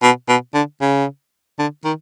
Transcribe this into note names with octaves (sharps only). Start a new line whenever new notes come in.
B2
B2
D3
C#3
D3
D#3